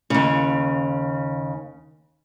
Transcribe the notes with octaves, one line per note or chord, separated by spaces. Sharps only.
D#2 C#3